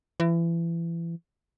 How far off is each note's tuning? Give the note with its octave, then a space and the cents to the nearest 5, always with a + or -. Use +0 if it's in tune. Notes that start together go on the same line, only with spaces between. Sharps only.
E3 +30